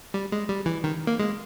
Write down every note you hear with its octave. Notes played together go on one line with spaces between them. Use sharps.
G3
G#3
G3
E3
D#3
A#3
G#3